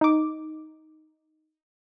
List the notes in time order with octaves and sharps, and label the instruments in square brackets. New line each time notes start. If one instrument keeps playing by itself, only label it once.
[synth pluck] D#4 D6